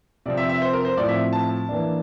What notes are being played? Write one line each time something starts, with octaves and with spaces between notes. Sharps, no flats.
C3 F3 C4 D5
E5
E5
C5
A#4
C5
A2 F3 C4 D5
E5
A5
E3 A#3 D4